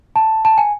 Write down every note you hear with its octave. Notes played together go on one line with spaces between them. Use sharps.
A5
A5
G#5